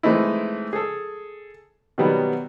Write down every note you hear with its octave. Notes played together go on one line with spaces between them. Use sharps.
E3 G#3 A3 C4 D#4 E4
G#4 A4
B2 D#3 F#3 G3 B3